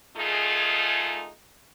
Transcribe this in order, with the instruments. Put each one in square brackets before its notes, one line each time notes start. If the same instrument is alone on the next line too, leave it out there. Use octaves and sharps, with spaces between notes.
[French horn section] D#3 A3 D#4 F4 G#4